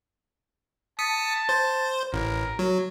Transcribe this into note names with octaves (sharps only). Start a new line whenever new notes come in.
A5 D#6 B6 C#7
C5
A1 A#4
F#3